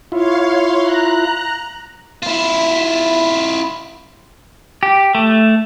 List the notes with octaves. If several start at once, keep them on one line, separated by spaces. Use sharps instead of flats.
E4 F4 C#5 F5 C6
A#5 F#6
E4 F4
G4
A3